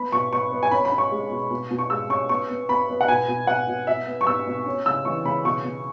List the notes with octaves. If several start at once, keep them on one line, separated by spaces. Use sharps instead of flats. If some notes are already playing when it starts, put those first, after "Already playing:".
Already playing: B3 B5
B2 C#6
B3 C#6
B3
G#5
C#4 B5
B5
C#4
C#6
G#3
B2
B2
B2
C#6
G#3 E6
C#4 C#6
B3 C#6
B3
B3 B5
B3
F#5
B2 G#5
B2
B2 F#5
B2
B2 E5
B3
C#6
B3 E6
B2
C#4
C#3 E6
E3 C#6
C#3 B5
B2 C#6
B2